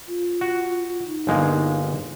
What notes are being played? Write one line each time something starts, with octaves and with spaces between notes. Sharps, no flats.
F4
F#4
D#4
G1 G#3 A#3